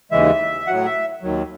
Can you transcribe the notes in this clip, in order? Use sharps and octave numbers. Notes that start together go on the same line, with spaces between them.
D#2 C#3 E3 G#3 E5
A2 F#3 F#5
E5
D#2 D#3 F#3